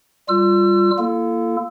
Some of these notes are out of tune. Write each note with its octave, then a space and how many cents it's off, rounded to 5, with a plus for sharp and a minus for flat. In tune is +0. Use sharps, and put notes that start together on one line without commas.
G3 +0 F4 +0 E6 +35
A#3 +0 F4 -45 A4 +0